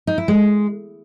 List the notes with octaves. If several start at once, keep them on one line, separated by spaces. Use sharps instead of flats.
D#4
E4
G#3